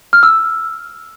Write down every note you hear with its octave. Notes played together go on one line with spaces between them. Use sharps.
F6
E6